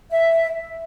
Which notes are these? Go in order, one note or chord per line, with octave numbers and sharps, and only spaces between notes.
E5